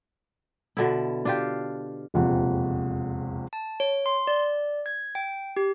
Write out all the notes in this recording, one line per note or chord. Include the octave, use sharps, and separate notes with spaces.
B2 D3 E4
D4 F4 G4
E1 A#1 F2 C3 F#5
A5
C#5
C6
D5
G#6
G5
G4